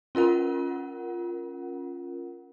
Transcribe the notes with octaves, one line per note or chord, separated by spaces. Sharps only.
C#4 F4 A#4 F#5